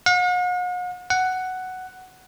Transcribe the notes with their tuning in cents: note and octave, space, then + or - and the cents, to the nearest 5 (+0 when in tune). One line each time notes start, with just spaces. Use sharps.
F#5 -45
F#5 +5